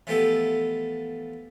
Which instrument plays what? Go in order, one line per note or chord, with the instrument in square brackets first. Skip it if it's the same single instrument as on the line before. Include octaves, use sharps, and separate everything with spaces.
[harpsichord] E3 F3 A3 B3 G4 A4